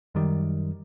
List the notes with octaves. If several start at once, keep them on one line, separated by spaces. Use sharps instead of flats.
F#2 D#3 G3